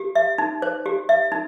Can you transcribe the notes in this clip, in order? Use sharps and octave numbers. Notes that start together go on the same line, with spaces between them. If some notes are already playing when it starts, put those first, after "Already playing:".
Already playing: G4
E5
D#4
C5
G4
E5
D#4